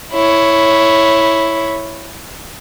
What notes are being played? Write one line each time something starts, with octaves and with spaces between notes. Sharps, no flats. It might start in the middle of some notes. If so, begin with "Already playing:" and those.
E4 C#5